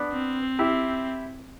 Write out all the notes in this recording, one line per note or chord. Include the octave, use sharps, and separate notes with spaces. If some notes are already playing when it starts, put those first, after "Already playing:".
Already playing: B3 D4
C4
E4 G4